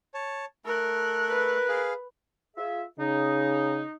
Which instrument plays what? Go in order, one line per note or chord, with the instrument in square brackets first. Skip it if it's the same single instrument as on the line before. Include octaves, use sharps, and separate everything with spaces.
[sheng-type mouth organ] C#5 A5
[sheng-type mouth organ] A3 A4 [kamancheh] A#4 F#6
[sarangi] B4
[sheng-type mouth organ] G#4 F5
[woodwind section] F4 G#4 E5
[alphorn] C#3 [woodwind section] D#4